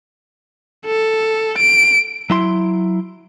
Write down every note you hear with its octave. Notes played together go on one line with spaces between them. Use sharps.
A4
D7
F#3 E4 C6